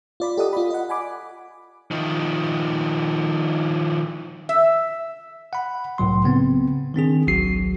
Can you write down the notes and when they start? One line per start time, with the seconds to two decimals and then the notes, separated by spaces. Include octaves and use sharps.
0.20 F4 D5 B5
0.37 G4 A4 D5 D#5 F#5 D#6
0.53 F4 D5 B5
0.70 D#5 F#5
0.89 F#5 G#5 B5 D6
1.91 D#3 F3
4.49 E5
5.53 F#5 B5
5.98 C2 A2 F#3 C6
6.24 C#3 B3 C4
6.94 D#3 C4 D4 G#4
7.27 G#1 C#2 F#3 F#4 C7